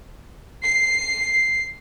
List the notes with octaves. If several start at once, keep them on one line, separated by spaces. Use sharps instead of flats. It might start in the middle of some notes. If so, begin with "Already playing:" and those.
C7